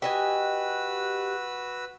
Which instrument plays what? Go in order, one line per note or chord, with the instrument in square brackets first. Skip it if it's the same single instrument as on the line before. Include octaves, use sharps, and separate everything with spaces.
[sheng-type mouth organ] F#4 B4 E6 [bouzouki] G4 D#5 G#5